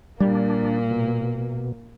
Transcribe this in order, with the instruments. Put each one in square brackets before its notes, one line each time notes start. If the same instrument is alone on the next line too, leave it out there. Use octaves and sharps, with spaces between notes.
[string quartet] A#2 A#3 [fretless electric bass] G3 [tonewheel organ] D4
[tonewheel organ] B2